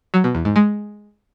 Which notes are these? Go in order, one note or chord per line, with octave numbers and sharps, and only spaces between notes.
F#3
B2
E2
G#2
G#3